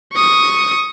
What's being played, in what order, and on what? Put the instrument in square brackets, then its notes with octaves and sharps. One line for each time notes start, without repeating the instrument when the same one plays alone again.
[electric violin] C#6 D#6